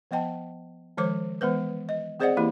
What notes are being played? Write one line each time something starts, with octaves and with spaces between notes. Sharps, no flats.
F3 B3 D#5 G5 A5
D#3 F3 G#3 C5 C#5 D6
E3 G#3 B3 B4 C5
D#5
C4 G#4 C5 D5 D#5 F#5
E3 A#3 E4 G4